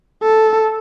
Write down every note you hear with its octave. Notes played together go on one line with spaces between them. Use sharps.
A4